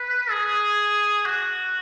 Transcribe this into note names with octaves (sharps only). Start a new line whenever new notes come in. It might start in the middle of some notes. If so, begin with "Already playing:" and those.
Already playing: B4
G#4
F#4